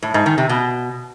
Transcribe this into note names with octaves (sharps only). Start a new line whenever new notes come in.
A2
G#2
D#3
C3
B2